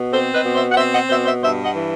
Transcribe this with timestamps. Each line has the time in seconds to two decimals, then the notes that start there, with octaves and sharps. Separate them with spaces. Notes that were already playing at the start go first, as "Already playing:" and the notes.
Already playing: B2
0.12 C4 A4 C5
0.34 B4 D#5
0.45 B2
0.55 C5 E5
0.71 F#5
0.77 C4 C5 E5
0.94 D#5 F#5
1.09 B2 C5 E5
1.25 C5 E5
1.43 G2 C5 E5
1.64 D#5 F#5
1.74 E3